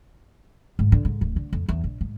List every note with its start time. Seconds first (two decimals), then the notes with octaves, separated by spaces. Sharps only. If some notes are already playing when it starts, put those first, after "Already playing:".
0.79 G#2
0.92 D3
1.05 G#2
1.21 D1
1.36 D3
1.53 F2
1.69 E2
1.84 A#1
2.01 G#2